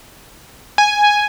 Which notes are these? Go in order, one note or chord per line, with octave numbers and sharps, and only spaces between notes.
G#5